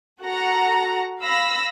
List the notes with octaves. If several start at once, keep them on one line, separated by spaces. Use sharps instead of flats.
F#4 A4 F#5 A#5 A#6
F5 B5 E6 A#6